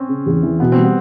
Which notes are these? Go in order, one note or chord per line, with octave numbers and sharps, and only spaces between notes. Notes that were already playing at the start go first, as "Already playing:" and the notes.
Already playing: C4 C#4
C#3
E2
E3
B2 B3
C4
G3
B3